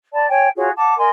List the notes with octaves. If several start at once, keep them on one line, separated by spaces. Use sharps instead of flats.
D5 A5 B5
C#5 G5 G#5
F4 F#4 G#4 C#5
F#5 A5 D6
A#4 D#5 G#5 C6